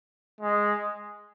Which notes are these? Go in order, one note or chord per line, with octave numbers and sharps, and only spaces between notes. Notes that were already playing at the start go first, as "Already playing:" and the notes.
G#3